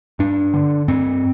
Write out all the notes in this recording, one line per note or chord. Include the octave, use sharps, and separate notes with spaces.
G2 D4
D3
G2 C4